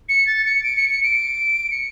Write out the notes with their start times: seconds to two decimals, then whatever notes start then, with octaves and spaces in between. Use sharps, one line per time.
0.09 C#7
0.27 A6
0.45 C#7
0.63 D7
0.77 C#7
0.90 C#7
1.03 D7
1.71 C#7